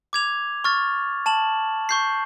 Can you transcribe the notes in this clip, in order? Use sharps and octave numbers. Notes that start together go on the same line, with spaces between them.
D6 G#6 F7
C#6 F6 A6
A5 E7 F#7
C#6 G6 C7